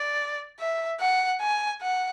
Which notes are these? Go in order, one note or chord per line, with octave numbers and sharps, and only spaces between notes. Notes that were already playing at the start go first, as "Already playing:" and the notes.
Already playing: D5
E5
F#5
G#5
F#5